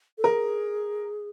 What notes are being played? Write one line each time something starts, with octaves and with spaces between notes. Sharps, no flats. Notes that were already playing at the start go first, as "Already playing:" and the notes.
A4
G#4 A#4